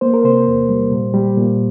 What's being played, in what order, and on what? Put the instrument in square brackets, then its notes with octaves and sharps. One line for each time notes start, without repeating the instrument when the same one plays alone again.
[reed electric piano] A#3 C5
A#4
C3 C5
E2
G3
A#2
G3
A#2